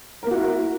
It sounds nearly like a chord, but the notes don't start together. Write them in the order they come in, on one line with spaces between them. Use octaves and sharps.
A#4 A#3 F#4 E4